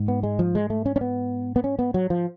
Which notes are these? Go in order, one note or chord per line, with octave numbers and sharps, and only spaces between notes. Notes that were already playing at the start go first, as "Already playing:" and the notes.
Already playing: G#2
B3
G#3
F3
G#3
A3
C#4
C#4
B3
B3
C#4
B3
F#3
F3